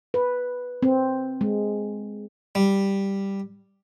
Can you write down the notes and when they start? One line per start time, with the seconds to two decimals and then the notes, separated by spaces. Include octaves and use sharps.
0.14 B4
0.83 C4
1.41 G#3
2.55 G3